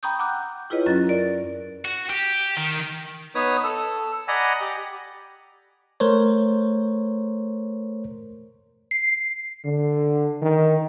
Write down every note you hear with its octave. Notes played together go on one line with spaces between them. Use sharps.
G5 A#5 B5 C#6 D#6 G6
F#5 A#5 D6 E6 F#6 G6
E4 F4 G#4 B4 C#5 D#5
F#2 F#3 C#4 F#6 A6
A#4 D5
F#4
G4
D#3
B3 D#4 B4 C#5 D#6
A4 E6
D5 D#5 F#5 G#5 A#5 B5
G4
A3 A#4 C5 C#5
C7
D3
D#3